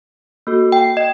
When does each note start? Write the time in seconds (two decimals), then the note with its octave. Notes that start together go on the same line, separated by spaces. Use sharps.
0.47 A#3 F#4 A4
0.72 G5
0.97 D#5